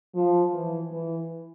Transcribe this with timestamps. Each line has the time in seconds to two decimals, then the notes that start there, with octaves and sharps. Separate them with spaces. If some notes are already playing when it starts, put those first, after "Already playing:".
0.15 F3
0.53 E3
0.91 E3